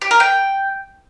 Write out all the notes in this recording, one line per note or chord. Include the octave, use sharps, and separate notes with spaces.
G4
A#4
G5